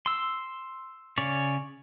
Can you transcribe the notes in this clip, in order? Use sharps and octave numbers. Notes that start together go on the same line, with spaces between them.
C6 E6
C#3 C#4 C#5 D5